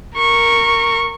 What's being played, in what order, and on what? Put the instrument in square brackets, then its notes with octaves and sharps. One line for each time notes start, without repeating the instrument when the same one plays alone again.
[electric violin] A#4 C#6